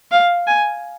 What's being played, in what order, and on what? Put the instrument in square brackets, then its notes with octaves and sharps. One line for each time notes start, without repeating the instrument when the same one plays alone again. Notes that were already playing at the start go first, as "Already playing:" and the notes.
[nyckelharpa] F5
G#5